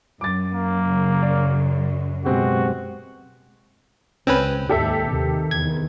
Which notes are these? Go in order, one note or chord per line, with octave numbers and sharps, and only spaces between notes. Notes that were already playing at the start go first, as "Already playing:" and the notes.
F#2 D6 A6
A#3
C#3
D5
B2 G#3 C4 F#4 G4
C#2 C4 C#4 B4
D#2 G#2 G4 A4 E5
D#2 C3 D#3
E2 D#3 G#6